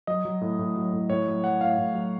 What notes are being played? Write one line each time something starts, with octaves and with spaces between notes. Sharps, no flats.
F#3 D#5
F#3
A2
A2
F#3
A2
A2 C#5
F#3
F#3 F#5
A2 F5
A2
F#3